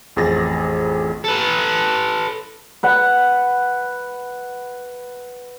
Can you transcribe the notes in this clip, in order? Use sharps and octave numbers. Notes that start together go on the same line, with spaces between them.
A1 F2 G#4 A6 A#6
A4 B4
B4 F#5